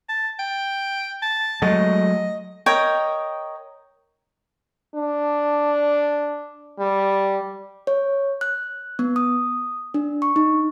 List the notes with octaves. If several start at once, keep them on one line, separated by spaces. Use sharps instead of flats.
A5
G5
A5
F#3 G#3 A3 D#5
A#4 C#5 D#5 G5
D4
G3
C#5
F#6
B3
D#6
D4
C#6
D#4